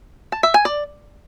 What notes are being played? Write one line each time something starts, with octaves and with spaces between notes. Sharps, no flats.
A5
E5
G#5
D5